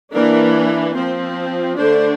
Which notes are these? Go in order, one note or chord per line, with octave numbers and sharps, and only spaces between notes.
E3 A#3 D4 A#4
F3 C4 C5
D3 A3 D4 C5